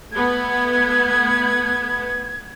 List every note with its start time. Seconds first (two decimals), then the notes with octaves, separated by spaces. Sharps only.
0.12 A3 B3 G#6